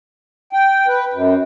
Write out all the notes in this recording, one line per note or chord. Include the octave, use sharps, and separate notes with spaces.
G5
B4
F#2